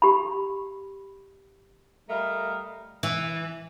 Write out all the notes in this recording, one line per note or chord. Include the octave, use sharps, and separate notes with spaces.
G4 B5
G3 A3 A#4 D#5 F5
E3